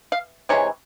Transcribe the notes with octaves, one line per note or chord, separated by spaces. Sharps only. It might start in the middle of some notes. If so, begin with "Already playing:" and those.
F5
C3 E3 G#3 C#5